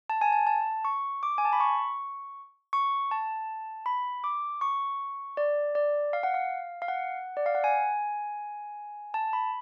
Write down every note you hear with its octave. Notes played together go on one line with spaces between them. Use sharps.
A5
G#5
A5
A5
C#6
D6
G#5
A5
B5
C#6
C#6
A5
B5
D6
C#6
D5
D5
F5
F#5
F5
F5
F#5
D5
F5
F#5
G#5
A5
B5